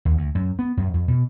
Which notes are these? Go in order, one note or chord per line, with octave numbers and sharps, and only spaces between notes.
D#2
D2
F#2
B3
F#2
F2
B2